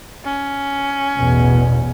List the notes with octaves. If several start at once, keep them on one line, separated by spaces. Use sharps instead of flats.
C#4
A1 E2 B2